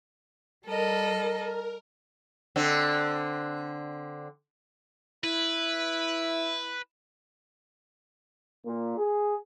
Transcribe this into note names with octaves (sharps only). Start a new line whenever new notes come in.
G3 A4 A#4 D#5
D3 C4
E4 B4
A#2
G#4